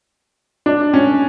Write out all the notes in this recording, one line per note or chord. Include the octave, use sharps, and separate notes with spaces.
D4
C#4